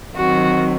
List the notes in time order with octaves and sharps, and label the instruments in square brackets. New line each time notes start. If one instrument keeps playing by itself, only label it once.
[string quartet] D#3 F#3 C4 F#4